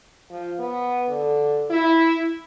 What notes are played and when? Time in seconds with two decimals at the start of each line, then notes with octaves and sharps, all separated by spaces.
0.31 F3
0.59 B3
1.08 D3
1.70 E4